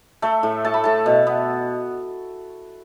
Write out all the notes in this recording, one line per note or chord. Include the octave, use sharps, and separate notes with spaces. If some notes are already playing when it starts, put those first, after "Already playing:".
A3 E5
A2
A3 A5
B5
A2 A5
B2
B3